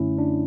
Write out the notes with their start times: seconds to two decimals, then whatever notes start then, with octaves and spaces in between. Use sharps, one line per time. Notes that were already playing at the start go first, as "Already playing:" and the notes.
Already playing: F#2 D3 A3 C#4 E4
0.18 D4